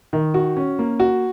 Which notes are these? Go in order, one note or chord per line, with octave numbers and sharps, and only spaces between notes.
D#3
F#4
C#4
A#3
F#4